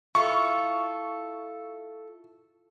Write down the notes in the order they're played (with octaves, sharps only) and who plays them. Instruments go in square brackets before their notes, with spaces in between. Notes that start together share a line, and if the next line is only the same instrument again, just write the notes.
[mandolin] E4 F4 A4 [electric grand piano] C#6